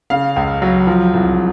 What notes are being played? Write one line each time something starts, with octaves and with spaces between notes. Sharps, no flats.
C#3 F5
C#2
F#3
F3
C2